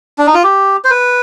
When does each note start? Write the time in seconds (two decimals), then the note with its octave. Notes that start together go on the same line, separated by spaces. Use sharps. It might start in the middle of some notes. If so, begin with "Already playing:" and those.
0.18 D4
0.26 D#4
0.34 F4
0.43 G4
0.84 C5
0.91 B4